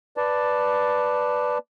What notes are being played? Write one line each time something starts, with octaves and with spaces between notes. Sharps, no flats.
B4 D5 A5